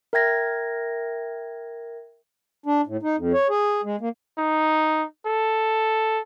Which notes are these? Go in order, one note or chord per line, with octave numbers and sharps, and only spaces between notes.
A#4 E5 G5 G#6 A#6
D4
A2
D#4
F2
C#5
G#4
G#3
A#3
D#4
A4